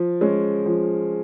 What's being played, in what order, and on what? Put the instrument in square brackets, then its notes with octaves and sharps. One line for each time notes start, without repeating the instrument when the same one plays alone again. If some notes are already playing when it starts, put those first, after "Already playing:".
Already playing: [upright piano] F3
G#3 C#4
F3